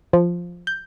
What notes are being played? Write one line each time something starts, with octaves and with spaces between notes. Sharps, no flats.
F3
G6